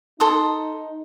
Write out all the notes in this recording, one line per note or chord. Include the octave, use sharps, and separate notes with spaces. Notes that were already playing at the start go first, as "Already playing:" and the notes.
D#4 A4 C6 D#6